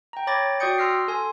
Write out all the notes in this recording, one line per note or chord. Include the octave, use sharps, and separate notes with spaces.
G5 A#5
C#5 G5 B5 D6 A6 A#6
F#4 D5 G5 D#6 G6 C#7
C6 E6 F6 A#6 C7
A4 G#5 C6